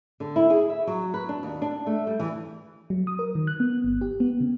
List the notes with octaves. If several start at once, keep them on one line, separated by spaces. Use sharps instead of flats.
D3
E4
G#4
E5
F#3
B4
D4
D#2
D4
A3
G3
E3
F#3
D#6
A#4
D#3
F#6
B3
G1
G4
B3
C#3